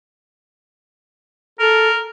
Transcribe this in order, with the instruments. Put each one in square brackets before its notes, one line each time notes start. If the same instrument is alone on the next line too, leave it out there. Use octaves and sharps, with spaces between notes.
[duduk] A4 [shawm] A#4